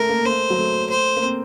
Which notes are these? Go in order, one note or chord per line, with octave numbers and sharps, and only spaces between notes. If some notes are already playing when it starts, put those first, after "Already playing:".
Already playing: A3 A#4
A#3
A3 C5
F#3
A3
C5
A#3
C4